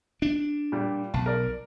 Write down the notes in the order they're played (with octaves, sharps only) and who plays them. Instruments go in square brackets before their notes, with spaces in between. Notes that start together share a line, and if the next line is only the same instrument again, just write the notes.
[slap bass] D4
[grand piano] A#2 G3
[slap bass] B1 [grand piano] A5
[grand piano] A#4 D5